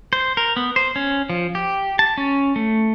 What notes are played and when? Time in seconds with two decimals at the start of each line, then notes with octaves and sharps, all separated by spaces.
0.13 C5
0.37 A#4
0.56 B3
0.76 C5
0.96 C#4
1.30 F3
1.55 G4
1.99 A5
2.17 C#4
2.56 A3